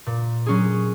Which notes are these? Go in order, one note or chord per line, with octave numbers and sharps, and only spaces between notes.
A#2
F#3 C#4 G#4